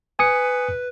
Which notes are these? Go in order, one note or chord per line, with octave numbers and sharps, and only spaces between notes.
B4 G#5 D#6 C#7